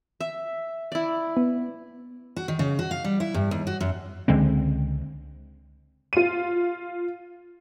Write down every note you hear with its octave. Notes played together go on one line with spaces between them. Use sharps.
E5
E4 D5
B3
F#4
D#3
C#3
F#4
F5
G3
E4
G2
D#2
F#4
F#2
C#2 D3 G#3 C4
F4 D#7